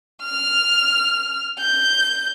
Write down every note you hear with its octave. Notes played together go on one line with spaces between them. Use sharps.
F6
G6